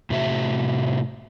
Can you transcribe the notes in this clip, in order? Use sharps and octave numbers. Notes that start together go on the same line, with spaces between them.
A2 C3 F#4 E5